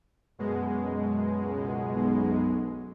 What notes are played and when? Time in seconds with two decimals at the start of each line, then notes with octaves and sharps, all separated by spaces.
0.39 F#2 B2 G#3
1.41 C#2
1.95 B1